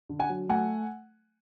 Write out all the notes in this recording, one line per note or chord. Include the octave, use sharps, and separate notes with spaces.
D3
F#5 G#5
F#3
A3 F#5 G#5